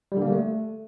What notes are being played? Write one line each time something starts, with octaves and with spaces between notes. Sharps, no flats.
G3
D3
A#3
G3
A3